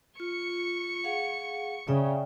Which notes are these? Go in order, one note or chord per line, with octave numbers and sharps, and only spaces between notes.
F4 C#6 C#7
G#4 F5 F#5
C#3 D5 E5 G5